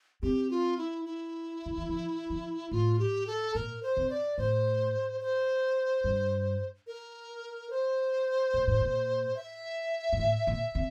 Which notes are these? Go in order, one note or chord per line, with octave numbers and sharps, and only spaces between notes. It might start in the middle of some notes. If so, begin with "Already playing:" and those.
C4 G4
F4
E4
E4
D3
E3
F3
F3
A2 F4
G4
A4
A#2 A#4
C5
C3
D5
A2 C5
C5
G2
A#4
C5
A#2
A2
A#2
E5
A#2
A2
A#2
C3